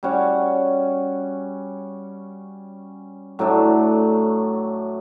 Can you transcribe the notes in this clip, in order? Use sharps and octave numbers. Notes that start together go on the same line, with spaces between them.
G3 C#4 F#4 C#5
A2 F#3 A3 D4